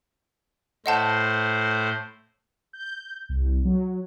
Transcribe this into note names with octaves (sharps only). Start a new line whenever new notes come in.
A2 C5 D#5 F#5 A5
G6
C2
F#3